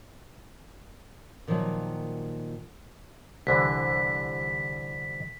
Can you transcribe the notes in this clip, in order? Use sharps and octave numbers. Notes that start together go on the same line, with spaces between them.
A#2 D#3 F3 F#3
C2 D3 E3 B6